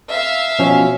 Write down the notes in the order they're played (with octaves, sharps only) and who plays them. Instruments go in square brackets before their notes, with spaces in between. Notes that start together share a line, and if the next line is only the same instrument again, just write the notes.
[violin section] E5 F5
[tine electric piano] B2 F3 C#4